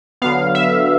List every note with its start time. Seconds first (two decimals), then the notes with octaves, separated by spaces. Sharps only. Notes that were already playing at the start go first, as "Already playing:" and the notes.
0.22 D3 F#3 B3 F5
0.55 E5